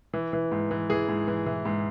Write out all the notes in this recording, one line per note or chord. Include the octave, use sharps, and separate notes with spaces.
E3
E3
G#2
E3
E3 G#4
G#2
E3
E3
G#2